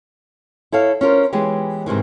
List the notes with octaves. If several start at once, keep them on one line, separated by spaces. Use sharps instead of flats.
E4 A4 C#5 F5
C#4 F4 A#4 C5
E3 G#3 B3 F4 G4 C#5
G#2 C3 D#3 E3